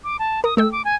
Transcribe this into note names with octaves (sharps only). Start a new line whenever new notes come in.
D6
A5
A#4 D#6
A3 A4 G5 E6
D6
G#5